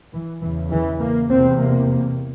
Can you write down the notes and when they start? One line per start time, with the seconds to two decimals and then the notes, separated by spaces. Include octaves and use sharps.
0.13 E3
0.42 E2 C#3 E3
0.72 E3
1.00 A#3
1.30 E2 C3 C4
1.59 A#3
1.88 A#3